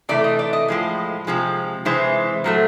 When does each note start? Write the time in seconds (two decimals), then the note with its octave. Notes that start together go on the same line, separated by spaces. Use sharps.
0.09 C3 E3 A3 D5
0.24 D#5
0.39 D5
0.53 D#5
0.68 A2 F3 G#3
1.27 C3 F3 G#3
1.85 C3 E3 G#3 C5
2.44 A#2 F#3 A3